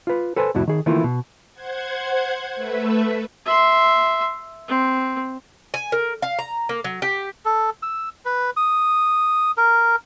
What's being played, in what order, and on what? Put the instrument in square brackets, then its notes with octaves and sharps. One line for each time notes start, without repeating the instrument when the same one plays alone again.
[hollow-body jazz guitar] F4 B4
A4 B4 C5 G#5
C2 F2 A2 E4 F#4
D#3 G#4
D#3 E3 A3 A#3 E4 F4
B2
[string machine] C5 F#5 G#6
A3 B4 E5
[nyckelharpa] E5 C6
C4
[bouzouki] G#5
A#4
F5
A#5
A#3
F#3
G4
[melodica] A4
E6
B4
D#6
A#4